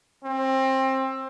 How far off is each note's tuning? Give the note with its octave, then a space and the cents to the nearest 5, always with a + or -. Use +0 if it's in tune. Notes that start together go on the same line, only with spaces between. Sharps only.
C4 +25